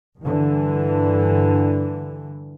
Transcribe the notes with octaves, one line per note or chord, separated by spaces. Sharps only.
G2 D3 E3